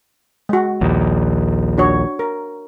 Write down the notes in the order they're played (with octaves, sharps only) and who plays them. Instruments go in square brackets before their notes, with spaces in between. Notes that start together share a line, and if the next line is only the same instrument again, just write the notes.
[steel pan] G#3 F#4
[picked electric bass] A#1 D#2
[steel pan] D4 F#4 C#5
A#4